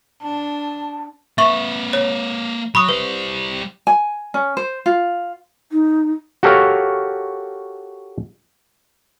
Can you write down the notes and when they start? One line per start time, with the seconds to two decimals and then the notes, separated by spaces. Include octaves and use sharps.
0.23 D4 A5
1.38 A#3 B4 E5 C#6 F#7
1.93 C#5
2.75 F#3 B5 C#6 D#6
2.89 G3 B4 C5
3.87 G#5
4.34 C#4
4.57 C5
4.86 F4
5.71 D#4
6.43 F#4 G4 A4 A#4 C#5 F5